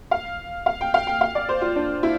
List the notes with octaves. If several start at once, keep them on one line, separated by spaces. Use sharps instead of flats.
F5
F5
G5
F5
G5
F5
D5
C5
F4
D4
E4